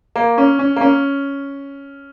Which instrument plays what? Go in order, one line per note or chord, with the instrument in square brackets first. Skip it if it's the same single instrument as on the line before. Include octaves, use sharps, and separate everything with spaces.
[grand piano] A#3
C#4
C#4
A#3
C#4